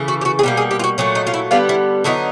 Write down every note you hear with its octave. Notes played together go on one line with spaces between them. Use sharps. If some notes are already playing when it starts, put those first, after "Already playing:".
Already playing: C#3 E3 A3
F#4
G4
F#4
G#4
B2 G3 A#3 G4
G#4
G4
F4
F#4
A#2 F#3 A3
D#4
F4
E4
D3 G3 B3 F4
E4
D3 F#3 B3 D#4 E4